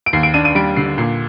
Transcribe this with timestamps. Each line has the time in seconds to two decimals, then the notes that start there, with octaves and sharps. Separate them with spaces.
0.06 D7
0.13 D#2 C7
0.23 D7
0.34 D4 D#7
0.45 D#7
0.55 G3 D7
0.77 D3 C7
0.98 A#2 C7